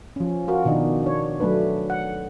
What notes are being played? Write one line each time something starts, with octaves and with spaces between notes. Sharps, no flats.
F3 C#4
F4 F#4 A#4
B2 D#3 D4 D#4
D4 C#5
F#3 A3 D4 B4
F#5